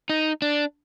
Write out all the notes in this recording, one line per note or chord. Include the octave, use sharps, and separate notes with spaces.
D#4
D4